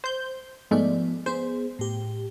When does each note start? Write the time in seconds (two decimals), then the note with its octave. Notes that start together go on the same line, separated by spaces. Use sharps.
0.04 C5 G6
0.71 G#2 F3 G#3 A3 B3 D5
1.26 B3 G#4 C5
1.79 A2 G4